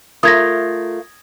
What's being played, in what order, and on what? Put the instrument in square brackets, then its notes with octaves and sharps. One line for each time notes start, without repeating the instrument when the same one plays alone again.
[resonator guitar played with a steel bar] A3 F4 A#4 [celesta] D#6 G#6 A#6